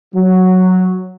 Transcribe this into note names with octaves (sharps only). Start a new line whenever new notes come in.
F#3